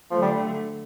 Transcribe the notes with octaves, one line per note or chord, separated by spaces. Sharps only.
D3 F3 F#3 A3
G3